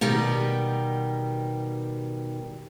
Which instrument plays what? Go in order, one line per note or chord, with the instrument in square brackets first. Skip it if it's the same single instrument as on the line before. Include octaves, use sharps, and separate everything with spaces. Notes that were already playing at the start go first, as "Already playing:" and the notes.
[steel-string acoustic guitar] B2 D#3 G3 G4